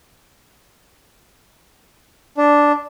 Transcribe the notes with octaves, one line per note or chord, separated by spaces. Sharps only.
D4